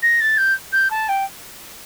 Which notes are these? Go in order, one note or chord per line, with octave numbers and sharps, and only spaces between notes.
A#6
A6
G6
G6
A5
G5